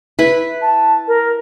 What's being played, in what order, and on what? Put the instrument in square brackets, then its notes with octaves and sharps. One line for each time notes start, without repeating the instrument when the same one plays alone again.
[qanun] E4 B4
[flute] A5
A#4